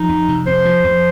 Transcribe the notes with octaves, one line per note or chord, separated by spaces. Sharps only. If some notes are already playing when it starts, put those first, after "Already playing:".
Already playing: F3 D#4
F2
C3
F2 C5
F3
F2